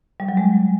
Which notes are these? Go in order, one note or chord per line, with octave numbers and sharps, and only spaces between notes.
G3
F#3
G#3